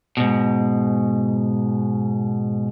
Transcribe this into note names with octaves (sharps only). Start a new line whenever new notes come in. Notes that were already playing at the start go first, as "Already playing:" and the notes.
G#2 B2